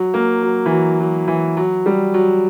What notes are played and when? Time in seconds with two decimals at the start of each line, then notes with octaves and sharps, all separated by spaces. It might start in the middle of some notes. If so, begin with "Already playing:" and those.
Already playing: F#3
0.14 A#3
0.43 F#3
0.66 E3
0.71 F#3
1.00 F#3
1.28 E3
1.57 F#3
1.86 G3
2.14 F#3